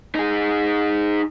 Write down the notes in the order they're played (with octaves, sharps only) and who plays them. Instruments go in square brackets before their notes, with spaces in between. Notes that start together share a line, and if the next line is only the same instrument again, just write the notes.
[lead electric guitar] D#4 G#4